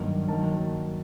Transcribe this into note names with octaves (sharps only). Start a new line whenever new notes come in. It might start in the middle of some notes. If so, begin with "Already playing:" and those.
Already playing: G2 D#3 F#3 A#3
D#3 F#3 A#3 A5